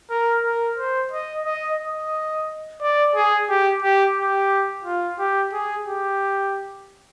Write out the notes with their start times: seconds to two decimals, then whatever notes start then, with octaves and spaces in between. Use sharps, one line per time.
0.10 A#4
0.43 A#4
0.77 C5
1.11 D#5
1.45 D#5
1.79 D#5
2.81 D5
3.15 G#4
3.49 G4
3.83 G4
4.17 G4
4.85 F4
5.19 G4
5.53 G#4
5.86 G4